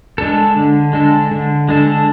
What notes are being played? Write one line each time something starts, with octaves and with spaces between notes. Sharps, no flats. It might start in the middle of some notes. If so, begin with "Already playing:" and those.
G#3 D4 A4
D3
G#3 D4 A4
D3
G#3 D4 A4